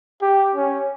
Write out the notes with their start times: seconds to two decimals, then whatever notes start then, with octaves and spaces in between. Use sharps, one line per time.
0.22 G4
0.55 C#4